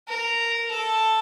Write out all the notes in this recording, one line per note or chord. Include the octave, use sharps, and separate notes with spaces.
A#4
A4